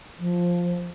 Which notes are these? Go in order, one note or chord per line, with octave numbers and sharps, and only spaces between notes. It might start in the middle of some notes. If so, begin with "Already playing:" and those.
F3